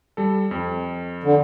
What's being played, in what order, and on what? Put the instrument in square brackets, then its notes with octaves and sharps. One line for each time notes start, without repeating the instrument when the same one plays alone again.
[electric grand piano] G3 A4
F2
[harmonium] D3